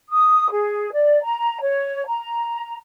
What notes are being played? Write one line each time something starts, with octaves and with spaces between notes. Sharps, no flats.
D#6
G#4
D5
A#5
C#5
A#5